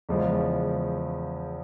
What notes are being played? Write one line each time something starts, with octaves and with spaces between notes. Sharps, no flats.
E2 C#3 F3 G#3